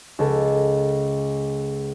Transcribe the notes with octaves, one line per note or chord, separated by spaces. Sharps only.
C#2 A4